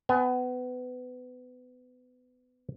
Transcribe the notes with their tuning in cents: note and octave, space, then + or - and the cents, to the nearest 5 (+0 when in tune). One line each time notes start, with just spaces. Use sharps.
B3 +25 G#5 +0